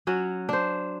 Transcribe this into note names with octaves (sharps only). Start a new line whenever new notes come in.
F#3 C#4 F#4
D4 C5